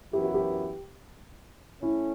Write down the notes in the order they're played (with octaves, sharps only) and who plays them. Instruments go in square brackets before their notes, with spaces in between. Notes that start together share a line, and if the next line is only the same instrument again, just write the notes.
[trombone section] F#2 E3 B3 E4 [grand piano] G4
[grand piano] F#4
G4
[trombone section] A3 C#4 [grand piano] E4